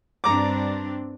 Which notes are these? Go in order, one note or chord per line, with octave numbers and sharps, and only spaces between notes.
G2 C4 D4 A#5 D6